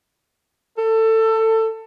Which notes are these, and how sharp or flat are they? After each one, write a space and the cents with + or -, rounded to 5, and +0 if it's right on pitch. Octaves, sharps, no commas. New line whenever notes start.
A4 +20